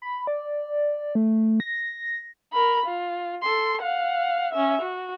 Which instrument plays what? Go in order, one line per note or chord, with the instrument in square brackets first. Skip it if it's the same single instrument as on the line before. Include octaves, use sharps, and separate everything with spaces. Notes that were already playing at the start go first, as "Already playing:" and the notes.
[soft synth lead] B5
D5
A3
A#6
[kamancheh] A#4 B5
F4
A4 C6
F5 F#5
C#4 E5
F#4